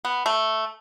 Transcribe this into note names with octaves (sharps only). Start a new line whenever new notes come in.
B3
A3